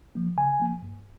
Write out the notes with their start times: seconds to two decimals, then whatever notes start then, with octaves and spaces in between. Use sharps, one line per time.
0.15 F3 A#3
0.37 C#3 G#5
0.60 F3 A#3
0.82 G2